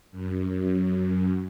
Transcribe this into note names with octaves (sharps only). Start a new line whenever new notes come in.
F#2
F#2